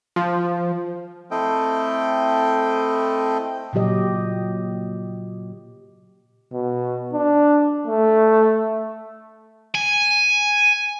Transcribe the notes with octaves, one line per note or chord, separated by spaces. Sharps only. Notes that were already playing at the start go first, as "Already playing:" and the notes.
F3
A3 C4 E4 A4 D#5 G5
A#2 C#3 F#3 G4 D#5
B2
D4
A3
G#5